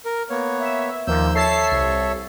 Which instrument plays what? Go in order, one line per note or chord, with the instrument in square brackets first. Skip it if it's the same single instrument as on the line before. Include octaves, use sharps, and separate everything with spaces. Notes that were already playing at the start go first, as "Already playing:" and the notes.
[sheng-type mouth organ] A#4
A#3 B3 C#5
[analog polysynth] E5
[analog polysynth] D#2 F3 [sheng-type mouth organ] A#3 E6 G6
[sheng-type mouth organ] A4 C#5 E5 [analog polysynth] A5 C7
[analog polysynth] C2